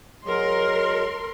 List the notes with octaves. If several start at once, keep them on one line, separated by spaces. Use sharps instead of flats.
F#3 G#3 A#4 C6